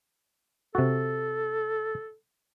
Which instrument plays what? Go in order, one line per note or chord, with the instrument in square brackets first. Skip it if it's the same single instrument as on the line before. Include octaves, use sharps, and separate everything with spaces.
[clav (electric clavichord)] C3 F#4 [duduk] A4